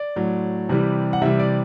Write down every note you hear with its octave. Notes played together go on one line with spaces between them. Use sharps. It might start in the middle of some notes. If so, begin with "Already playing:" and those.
Already playing: D5
A2 F#3
C3 E3 G3
F#5
C3 E3 G3 E5
D5